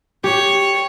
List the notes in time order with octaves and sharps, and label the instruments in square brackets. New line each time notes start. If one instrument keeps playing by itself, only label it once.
[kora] G4 [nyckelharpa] C#5